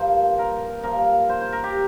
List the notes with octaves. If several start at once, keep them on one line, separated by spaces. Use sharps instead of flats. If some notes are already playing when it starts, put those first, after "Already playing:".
Already playing: G2 F3 A#3 C5
A#4
G2 F3 A#3 A#4
C5
C5
A#4
G4